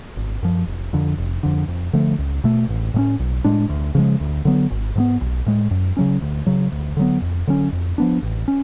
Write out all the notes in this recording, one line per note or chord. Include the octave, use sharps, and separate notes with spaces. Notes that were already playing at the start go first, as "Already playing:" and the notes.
G#1
F#2 F3
F1
F2 D3
F1
F2 D3
F2
D3 F3 A3
C#2
B2 A3
A1
A2 G#3 C#4
B1
A2 G#3 D4
D2
C#3 F3 G#3
D2
D3 F#3 B3
G#1
G#2 F#3 B3
B1
A2 G#3
F#2
C#3 F#3 C#4
D2
C#3 F#3
D2
D3 F#3 B3
F2
D3 F#3 C#4
F2
F3 B3 D4
A1
C#4